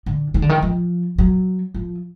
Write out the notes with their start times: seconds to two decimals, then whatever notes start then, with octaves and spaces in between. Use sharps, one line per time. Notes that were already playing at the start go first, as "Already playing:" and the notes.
0.06 D3
0.34 D#3
0.42 D3
0.49 D#3
0.62 F3
1.18 F#3
1.74 F3